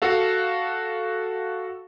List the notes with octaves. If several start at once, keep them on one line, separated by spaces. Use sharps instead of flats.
F#4 A4 F5